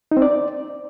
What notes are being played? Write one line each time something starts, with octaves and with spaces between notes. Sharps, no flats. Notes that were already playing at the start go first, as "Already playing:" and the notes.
D#4
C4
D5